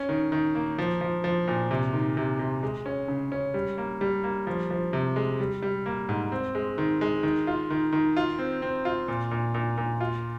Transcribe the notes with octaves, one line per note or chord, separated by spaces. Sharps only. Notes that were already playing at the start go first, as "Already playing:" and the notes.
Already playing: C#4
D#3
D#3
A#3
F3
F3
F3
A#2
C3
D#3
C3
C3
G#3
C#4
C#3
C#4
G3
A#3
G3
A#3
F3
F3
C3
G#3
G3
G3
A#3
G#2
C4
G#3
D#3
G#3
D#3
F4
D#3
D#3
F4
C4
C4
F4
A#2
A#2
A#2
A#2
F4